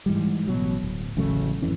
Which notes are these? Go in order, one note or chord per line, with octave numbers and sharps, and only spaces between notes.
G#2 E3 G3
A1 B2 F#3
D1
A1 C#3 F#3 A3
G#1 F2 E3 C#4